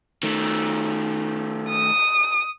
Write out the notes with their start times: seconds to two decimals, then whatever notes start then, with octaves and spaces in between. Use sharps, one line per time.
0.23 D#3 A3
1.69 D#6